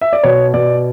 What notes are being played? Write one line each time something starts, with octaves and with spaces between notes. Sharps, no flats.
E5
D5
B2 C#5
B2 D5